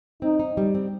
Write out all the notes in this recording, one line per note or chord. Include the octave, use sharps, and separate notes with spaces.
C4 D#4
D#4
G3
C4